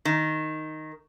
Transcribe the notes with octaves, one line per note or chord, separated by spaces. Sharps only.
D#3